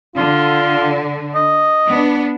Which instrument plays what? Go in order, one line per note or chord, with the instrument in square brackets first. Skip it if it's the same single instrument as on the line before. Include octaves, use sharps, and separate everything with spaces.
[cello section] D3 [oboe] F4
[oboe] D#5
[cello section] B3 D4